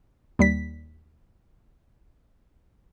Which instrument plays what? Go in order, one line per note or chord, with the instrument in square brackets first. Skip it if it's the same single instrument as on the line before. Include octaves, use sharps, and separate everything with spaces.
[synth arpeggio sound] D#2 G3 B6